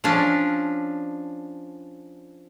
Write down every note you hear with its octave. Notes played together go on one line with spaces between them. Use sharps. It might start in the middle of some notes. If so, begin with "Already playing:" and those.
F3 C#4 D4